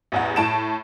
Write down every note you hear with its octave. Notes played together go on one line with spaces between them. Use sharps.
A1 E2 F#5
A2 A5 D7 E7